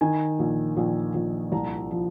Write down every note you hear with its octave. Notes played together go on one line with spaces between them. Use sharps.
D#3 G#5
A#1
A#1
A#1
C2 A#5
F3